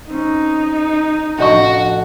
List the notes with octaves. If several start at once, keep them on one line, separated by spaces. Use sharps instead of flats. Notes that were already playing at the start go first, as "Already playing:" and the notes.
C4 C#4 D#4
A1 F3 D4 F#4 D#5 C#6